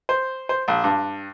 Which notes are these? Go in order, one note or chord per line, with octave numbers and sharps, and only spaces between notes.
C5
C5
A#1
G2